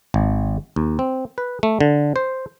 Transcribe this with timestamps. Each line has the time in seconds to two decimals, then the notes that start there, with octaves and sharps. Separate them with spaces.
0.14 G#1
0.76 D#2
0.99 C4
1.38 B4
1.63 A3
1.80 D3
2.16 C5